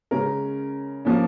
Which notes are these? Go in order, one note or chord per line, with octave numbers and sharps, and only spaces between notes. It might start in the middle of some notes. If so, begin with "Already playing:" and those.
C#3 G#3 C#4 A#4
F3 A#3 C#4